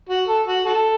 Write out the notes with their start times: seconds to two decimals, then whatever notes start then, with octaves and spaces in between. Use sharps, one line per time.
0.09 F#4
0.28 A4
0.47 F#4
0.66 F#4 A4